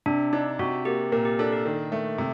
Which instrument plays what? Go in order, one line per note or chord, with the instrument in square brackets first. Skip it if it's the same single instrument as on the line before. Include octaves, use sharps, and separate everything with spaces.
[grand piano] C3 [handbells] D4
[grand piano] D4 [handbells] D#4
[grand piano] C3 [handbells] F#4
[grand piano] A#3 [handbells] G4
[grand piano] A#2 [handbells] A#4
[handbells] G4
[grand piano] D4 [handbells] A4
[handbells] A#4
[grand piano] D#3
A3
C3